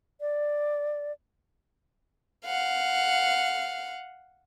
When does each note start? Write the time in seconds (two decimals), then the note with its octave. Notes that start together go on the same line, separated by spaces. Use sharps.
0.21 D5
2.45 F5 F#5